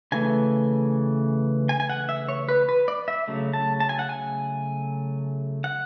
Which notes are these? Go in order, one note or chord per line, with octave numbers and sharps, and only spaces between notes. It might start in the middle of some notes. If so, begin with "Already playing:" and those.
C#3 E3 A3 G#5
G#5
G#5
F#5
E5
C#5
B4
B4
D5
E5
C#3 F#3 A3
A5
A5
G#5
F#5
G#5
F#5